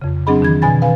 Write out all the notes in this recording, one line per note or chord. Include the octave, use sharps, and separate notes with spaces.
F2 C#3
F#3 C4 D4 G#4 D#5 B5
F2 D#3 E3 G#6
B2 D3 F3 G#5 B5 A6
B4 F5 G#5